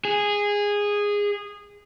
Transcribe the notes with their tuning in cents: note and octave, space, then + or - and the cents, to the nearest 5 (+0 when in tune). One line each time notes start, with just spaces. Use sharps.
G#4 -15